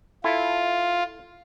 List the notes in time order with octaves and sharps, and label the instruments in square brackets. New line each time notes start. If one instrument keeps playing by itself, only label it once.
[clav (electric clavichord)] E4 A4 [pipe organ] F4